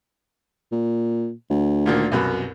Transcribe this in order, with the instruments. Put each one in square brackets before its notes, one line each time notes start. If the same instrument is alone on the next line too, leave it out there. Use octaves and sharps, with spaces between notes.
[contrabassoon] A#2
D2
[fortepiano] A#2 D3 D#3
C2 F#2 B2